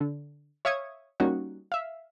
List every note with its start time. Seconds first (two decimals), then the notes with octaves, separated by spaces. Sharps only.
0.01 D3
0.65 C#5 E5 F5 C#6 D#6 G#6
1.20 G3 A#3 C#4 D#4 F#4
1.72 E5 F5